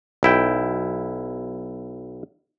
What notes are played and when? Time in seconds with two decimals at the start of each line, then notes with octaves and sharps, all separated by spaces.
0.23 B1 E4 G5